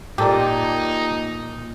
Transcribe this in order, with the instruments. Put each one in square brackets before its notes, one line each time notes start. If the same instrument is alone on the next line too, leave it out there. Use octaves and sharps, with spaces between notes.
[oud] A#2 [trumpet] D#4 [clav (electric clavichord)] G4 A4 D5